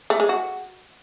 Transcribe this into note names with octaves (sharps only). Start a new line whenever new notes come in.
A3
G#3
F#4